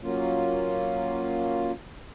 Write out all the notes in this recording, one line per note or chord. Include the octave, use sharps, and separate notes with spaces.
F#3 A#3 C#4 F4